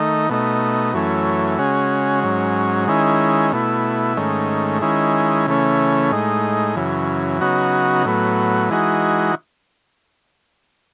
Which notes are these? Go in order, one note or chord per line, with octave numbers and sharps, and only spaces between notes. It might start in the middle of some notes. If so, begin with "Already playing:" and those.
Already playing: D#3 A3 D#4
B2 A3 D#4
F#2 E3 A3 C#4
C#3 G#3 C#4 F#4
G#2 F#3 C#4
D#3 G#3 C#4 E4
B2 A3 E4
G#2 D#3 A3 C#4
D#3 G#3 C#4 E4
C#3 E3 A3 C#4
A2 G#3 D#4
F#2 C#3 E3
C#3 F#3 B3 D#4 F#4
A2 F#3 B3
E3 G#3 D#4 F#4